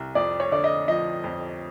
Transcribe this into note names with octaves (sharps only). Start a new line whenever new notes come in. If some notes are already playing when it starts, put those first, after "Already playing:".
Already playing: C2
F2 D5
C#5
D3 D5
D#5
F3 D#5
F2